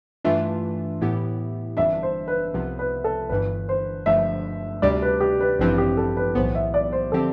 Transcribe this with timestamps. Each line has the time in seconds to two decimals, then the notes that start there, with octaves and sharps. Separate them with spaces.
0.24 G2 E3 A3 D4 F4 E5
1.01 A2 E3 B3 E4 G4
1.77 G1 F2 E3 G3 D4 E5
2.03 C5
2.28 B4
2.54 C2 C3 F3 B3 F4
2.79 B4
3.04 A4
3.29 G1 G2 E3 B4
3.69 C5
4.06 G1 G2 F3 A3 E5
4.82 D2 C3 G3 D4 G4 D5
5.02 B4
5.20 G4
5.40 B4
5.59 A1 G2 F3 C4 E4 B4
5.78 G4
5.97 A4
6.17 B4
6.35 B1 A2 E3 B3 C5
6.55 E5
6.74 D5
6.92 C5
7.12 D3 F3 C4 G4 A4